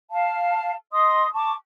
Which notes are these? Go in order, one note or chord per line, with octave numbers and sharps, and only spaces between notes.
F5 A5
D#5 C6 D#6
A5 C#6 D6